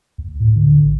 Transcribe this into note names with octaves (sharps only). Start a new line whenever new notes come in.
D2
A2
D3
A1